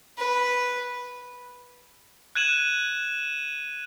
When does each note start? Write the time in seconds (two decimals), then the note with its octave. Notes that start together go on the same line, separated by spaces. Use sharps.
0.18 B4
2.35 F#6 G#6 D#7 E7 F#7